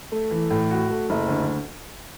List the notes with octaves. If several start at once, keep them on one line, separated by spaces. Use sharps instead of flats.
A3
E3
A2
F#4
A3
F#1
D2